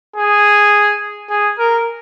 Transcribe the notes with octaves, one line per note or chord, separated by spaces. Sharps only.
G#4
G#4
A#4